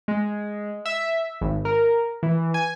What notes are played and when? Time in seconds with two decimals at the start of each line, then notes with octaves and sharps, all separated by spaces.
0.08 G#3
0.85 E5
1.41 G#1
1.65 A#4
2.23 E3
2.54 G#5